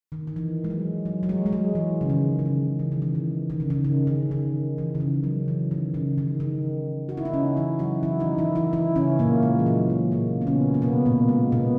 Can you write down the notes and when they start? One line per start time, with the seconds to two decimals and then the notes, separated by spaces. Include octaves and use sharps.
0.12 D#3
0.27 D#3
0.36 E3
0.64 G#3
0.70 F#3
1.06 F#3
1.23 F#3
1.29 G#3
1.46 G#3
1.53 F#3
1.75 E3
2.01 C#3
2.09 D#3
2.39 C#3
2.45 D#3
2.79 E3
2.92 D#3
3.02 E3
3.15 D#3
3.50 D#3
3.60 C#3
3.70 D#3
3.85 C#3
4.07 D#3
4.31 D#3
4.78 E3
4.95 C#3
5.00 D#3
5.24 F#3
5.48 E3
5.71 D#3
5.94 C#3
6.18 D#3
6.40 D#3
7.09 F#4
7.17 E4
7.25 D#4
7.33 C#3 C#4
7.57 E3 E4
7.79 F#3 F#4
8.03 E3 E4
8.20 D#3 D#4
8.38 E3 E4
8.55 E3 E4
8.73 E3 E4
8.96 C#3 C#4
9.19 A#2 A#3
9.43 G#3
9.59 E3
9.66 F#3
9.90 G#3
10.12 A#2 A#3
10.41 B3
10.47 C#3 C#4
10.74 A#3
10.82 B2 B3
11.05 A#2 A#3
11.28 G#3
11.52 B2 B3